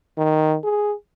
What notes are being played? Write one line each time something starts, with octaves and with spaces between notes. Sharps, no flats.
D#3
G#4